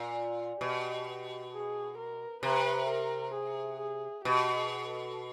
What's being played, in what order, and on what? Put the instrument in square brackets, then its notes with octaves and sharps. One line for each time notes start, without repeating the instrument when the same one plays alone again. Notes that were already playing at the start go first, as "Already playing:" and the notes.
Already playing: [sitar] A#2
[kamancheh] F4
[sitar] B2 [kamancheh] G4
[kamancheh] G#4
A#4
[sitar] C3 [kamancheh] B4
[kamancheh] A#4
G#4
G#4
[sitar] B2 [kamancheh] G4
[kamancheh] G#4
A4